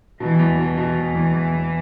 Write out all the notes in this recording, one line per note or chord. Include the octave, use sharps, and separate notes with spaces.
B2 E3
E2
B2 E3
B2
E2
E2
E2
E2